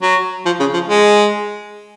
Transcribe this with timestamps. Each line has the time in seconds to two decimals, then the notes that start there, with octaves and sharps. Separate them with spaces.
0.02 F#3
0.45 F3
0.60 C#3
0.74 F3
0.88 G#3